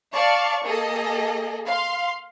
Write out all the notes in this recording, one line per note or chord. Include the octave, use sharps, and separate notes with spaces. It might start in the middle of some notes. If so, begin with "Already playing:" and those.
D5 F5 A5 C#6
A#3 G#4 A4 D#5
F5 C6